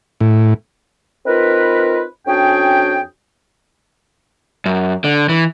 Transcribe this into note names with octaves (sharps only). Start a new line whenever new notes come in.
A2
C4 D#4 F4 A#4 B4
F2 C#4 D4 F#4 G#4 G5
F#2
D3
E3